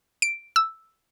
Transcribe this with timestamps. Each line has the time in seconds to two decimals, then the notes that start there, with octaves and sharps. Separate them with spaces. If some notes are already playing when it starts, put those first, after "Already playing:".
0.22 D7
0.56 E6